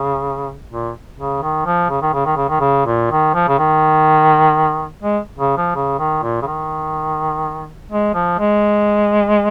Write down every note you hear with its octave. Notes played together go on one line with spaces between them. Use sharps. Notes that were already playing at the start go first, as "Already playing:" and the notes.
Already playing: C#3
A#2
C#3
D#3
F3
C#3
D#3
C#3
D#3
C#3
D#3
C#3
A#2
D#3
F3
C#3
D#3
G#3
C#3
F3
C#3
D#3
A#2
C#3
D#3
G#3
F3
G#3